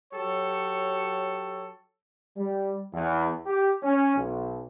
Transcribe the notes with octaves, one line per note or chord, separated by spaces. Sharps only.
F#3 G4 A4 C#5
G3
E2
G4
C#4
B1